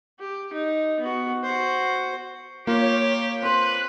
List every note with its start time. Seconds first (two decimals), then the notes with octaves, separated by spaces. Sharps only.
0.19 G4
0.53 D#4
0.99 B3 F#4
1.44 F#4 C5
2.67 A#3 F4 G4 C#5
3.42 C4 B4 C5 F#6